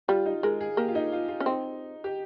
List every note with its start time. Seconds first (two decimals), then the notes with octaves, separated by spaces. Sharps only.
0.08 G3 F4
0.26 D#4
0.43 G#3 A#4
0.61 G#4
0.77 A#3 G4
0.88 F4
0.95 D#4
1.12 F4
1.28 F4
1.40 C#4
1.46 C4 D#4
2.04 G4